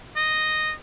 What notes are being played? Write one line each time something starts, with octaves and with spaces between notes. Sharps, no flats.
D#5